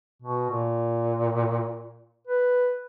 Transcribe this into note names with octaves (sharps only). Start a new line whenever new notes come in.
B2
A#2
B4